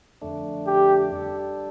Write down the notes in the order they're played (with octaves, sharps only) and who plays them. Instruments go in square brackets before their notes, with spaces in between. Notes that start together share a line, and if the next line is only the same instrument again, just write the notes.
[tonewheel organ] F2 D3 A3 D4
[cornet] G4
[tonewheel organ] G3 D4 A4